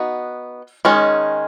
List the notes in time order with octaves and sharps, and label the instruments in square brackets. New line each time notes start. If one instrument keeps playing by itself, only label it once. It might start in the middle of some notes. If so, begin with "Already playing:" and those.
Already playing: [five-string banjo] B3 D#4 F#4
D#3 G#3 C#4